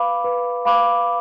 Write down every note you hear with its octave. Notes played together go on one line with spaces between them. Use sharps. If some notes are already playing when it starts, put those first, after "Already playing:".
Already playing: B4 F5 B5 D6
B4
F5 B5 D6